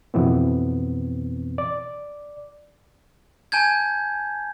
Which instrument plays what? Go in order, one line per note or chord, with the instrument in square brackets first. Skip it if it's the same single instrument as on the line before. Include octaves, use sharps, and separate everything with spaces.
[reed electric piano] F2 B2 E3 B3 C4
D5
[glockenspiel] G#5 A5 G6 G#6